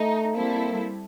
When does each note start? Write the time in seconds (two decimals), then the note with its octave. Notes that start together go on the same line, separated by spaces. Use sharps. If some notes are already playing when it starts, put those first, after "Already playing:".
Already playing: A3 D#4
0.35 G3 A#3 C4 E4 A4